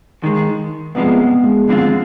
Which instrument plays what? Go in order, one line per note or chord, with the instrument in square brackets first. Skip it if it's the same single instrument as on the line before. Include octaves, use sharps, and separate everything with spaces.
[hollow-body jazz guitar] D#2 D#3 G#3
[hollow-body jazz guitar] C2 C3 F3 G#3 [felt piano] B3
[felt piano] B3
G#3
[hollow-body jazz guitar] D#2 D3 G#3 C4 F4 [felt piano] F3